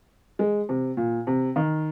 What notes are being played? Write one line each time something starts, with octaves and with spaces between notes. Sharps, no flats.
G#3
C3
A#2
C3
D#3